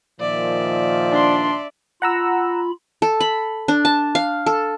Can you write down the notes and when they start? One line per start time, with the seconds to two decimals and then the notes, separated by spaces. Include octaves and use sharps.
0.20 A#2 D#3 F3 D5 E5
1.11 D4 C6
2.02 F4 F#5 A#5 B5 E6
3.02 A4
3.20 B5
3.68 D4
3.85 A5
4.15 F5
4.46 A4